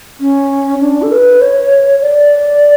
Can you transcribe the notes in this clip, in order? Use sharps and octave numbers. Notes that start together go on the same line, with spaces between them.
C#4
D4
A4
B4
C#5
D5